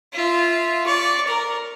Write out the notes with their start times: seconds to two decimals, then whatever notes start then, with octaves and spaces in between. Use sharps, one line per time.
0.13 F4 E5
0.86 D5 C#6
1.27 A#4